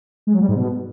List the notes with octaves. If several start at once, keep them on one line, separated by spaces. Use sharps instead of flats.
G#3
F#3
G3
G#2
B2